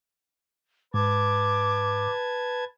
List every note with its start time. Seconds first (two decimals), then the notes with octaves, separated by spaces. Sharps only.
0.94 G#2 B4 A5 D6 G#6